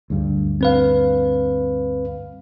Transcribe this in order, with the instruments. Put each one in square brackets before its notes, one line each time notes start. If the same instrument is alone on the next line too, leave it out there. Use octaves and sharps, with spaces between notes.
[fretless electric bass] D2 G2
[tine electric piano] C4 B4 F5